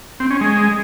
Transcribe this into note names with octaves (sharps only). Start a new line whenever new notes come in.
C4
C#4
G#3